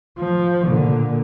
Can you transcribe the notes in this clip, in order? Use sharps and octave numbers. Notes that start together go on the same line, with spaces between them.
F3
A#2 D3